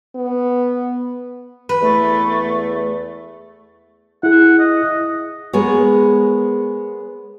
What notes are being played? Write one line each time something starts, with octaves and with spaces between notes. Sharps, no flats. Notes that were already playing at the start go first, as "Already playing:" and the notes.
B3
B4
E2 A3
E4 G#4 F#5
D#5
G#3 B3 G#4 A#4 C#5